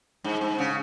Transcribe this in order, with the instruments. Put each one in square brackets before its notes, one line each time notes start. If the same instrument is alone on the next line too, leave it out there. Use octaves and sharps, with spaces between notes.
[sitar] G#2
G#2
C#3